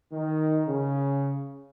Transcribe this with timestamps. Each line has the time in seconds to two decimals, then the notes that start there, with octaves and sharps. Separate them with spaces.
0.11 D#3
0.67 C#3